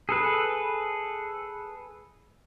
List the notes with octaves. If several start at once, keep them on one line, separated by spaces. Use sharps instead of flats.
G#4 A4 B4